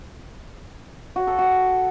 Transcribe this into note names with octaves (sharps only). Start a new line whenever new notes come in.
F#4
A4
F#4